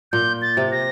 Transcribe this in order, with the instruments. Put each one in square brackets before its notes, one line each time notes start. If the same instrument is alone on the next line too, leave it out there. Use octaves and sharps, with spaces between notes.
[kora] A#2 [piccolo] G6
[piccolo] A6
[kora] C3
[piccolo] A#6